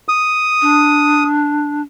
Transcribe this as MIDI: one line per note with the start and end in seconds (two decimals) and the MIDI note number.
0.08 1.24 87
0.62 1.81 62